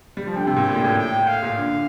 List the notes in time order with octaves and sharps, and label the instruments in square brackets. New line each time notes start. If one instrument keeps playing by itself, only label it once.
[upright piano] G3
F3
[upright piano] D3 [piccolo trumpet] G5
[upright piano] C3
A#2
A2
A#2
A2
[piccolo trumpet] G5
F5
[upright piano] A#2
D3